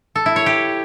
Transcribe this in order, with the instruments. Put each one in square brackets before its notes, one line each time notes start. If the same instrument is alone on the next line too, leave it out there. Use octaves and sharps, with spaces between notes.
[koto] A4
E4
C#5
G4